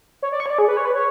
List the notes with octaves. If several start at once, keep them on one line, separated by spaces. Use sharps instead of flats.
C#5
D5
C#6
C#5
D5
G#4
B4
C#5
B4
C#5